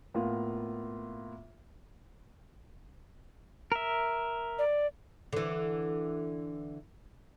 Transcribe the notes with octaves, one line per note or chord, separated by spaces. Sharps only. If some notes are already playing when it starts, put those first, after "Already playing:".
A2 A#3 B3 F4
A#4 E5
D5
D3 E3